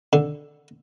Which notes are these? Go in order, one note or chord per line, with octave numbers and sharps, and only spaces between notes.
D3